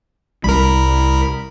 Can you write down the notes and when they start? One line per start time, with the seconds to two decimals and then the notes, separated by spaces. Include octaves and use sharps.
0.44 C2 G3 A#4 B5